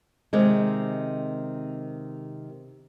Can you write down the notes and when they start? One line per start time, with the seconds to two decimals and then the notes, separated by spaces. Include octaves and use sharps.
0.33 C3 D#3 G#3